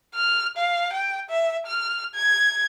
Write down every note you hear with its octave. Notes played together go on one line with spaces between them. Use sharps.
F6
F5
G5
E5
F6
G#6